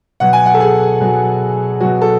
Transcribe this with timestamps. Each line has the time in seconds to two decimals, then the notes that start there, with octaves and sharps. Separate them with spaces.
0.20 B2 F#3 F#5
0.33 G#5
0.46 F#5
0.54 A4
0.60 G#4
1.00 B2 F#3
1.80 B2 F#3 F#4
2.02 A4